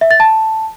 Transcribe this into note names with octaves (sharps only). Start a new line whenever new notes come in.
E5
A6
A5